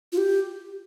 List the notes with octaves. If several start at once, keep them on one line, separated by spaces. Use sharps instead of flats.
F4
G4